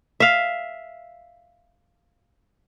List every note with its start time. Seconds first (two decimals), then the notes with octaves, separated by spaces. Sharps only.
0.20 E5 F5